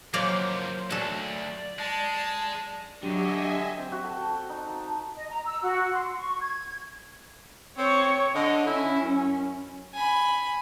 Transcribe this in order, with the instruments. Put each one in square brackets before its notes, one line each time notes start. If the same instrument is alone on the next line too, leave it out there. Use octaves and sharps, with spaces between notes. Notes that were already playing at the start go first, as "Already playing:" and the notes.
[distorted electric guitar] F2 C#3 [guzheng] F#3 A#3 D5 [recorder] C5
[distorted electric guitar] D2 [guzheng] F#4 A4 [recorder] D5
[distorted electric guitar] G#3 [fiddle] A5
[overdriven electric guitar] D3 [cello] F#3 [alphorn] G4 [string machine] D#5 E5 G#5
[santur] C4
F#4
A4
G5
F#4
D#4
A5
[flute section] D#5
A#5
E6
F#4
C6
C#6
G#6
[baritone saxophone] C4 [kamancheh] C#5 C#6
[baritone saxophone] D3 [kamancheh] D#5
[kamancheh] C#4 [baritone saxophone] E4
[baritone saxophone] F#2
[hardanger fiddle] G#5 B5